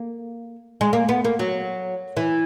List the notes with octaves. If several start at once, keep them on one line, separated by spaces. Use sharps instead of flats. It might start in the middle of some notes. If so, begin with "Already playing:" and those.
Already playing: A#3
G#3
A#3
B3
A#3
F#3
E3